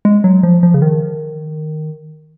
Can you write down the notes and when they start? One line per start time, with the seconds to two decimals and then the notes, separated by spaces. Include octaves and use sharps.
0.05 G#3
0.24 F#3
0.43 F3
0.63 F3
0.74 C#3
0.82 D#3